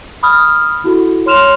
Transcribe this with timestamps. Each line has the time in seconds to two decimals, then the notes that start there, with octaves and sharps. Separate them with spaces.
0.23 B5 D#6 F6
0.84 E4 F#4 A4
1.26 C#5 C6 F6 E7 F7